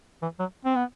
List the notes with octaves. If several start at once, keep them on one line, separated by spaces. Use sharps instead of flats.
E3
F#3
C4
B3